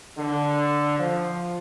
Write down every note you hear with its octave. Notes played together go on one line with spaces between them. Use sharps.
D3
F3